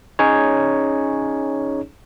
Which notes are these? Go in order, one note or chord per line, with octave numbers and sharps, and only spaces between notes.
C#4 D#4 G#4 C#5